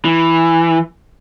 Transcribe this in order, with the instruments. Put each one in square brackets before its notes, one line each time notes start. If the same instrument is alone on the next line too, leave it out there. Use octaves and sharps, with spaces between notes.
[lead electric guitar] E3